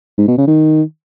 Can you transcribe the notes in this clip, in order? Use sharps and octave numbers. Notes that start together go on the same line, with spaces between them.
G#2
B2
C#3
D#3